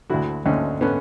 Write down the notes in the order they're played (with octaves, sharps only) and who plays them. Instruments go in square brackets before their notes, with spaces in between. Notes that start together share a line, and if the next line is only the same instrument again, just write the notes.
[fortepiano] D2 D3 E4 F#4
D2 D3 C#4 D#4
D3 B3 C#4